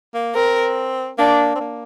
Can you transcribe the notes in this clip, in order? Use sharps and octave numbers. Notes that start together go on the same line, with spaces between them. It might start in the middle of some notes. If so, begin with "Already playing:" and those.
A#3
C4 A#4
A#3 D4
C4
A#3